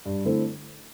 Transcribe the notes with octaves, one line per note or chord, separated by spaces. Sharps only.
G2
D3 A3 C4 E4